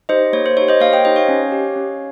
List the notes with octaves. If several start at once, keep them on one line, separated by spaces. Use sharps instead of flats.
D#4 G4 C5 D#5
A#3 C#5
C5
D#4 G4 C#5
C5 D#5
A#3 C#5 F5
D#5 G5
D#4 G4 C5 D#5
C#5 F5
C#4
G4
C#4